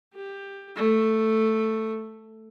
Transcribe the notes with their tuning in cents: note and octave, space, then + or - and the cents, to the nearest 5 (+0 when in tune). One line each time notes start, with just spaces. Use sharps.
G4 +15
A3 +5